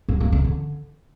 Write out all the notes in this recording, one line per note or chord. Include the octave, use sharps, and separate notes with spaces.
G2
A#3
C#3
D3